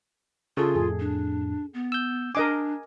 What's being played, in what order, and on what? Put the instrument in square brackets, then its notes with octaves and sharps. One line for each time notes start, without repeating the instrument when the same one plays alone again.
[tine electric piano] C#3 [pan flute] F4 [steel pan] G#4 A4
[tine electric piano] F2 A2 [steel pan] G#4
[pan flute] D4
B3
[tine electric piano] E6 G6
[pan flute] D4 [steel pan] A#4 D#5 D6 [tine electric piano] G#5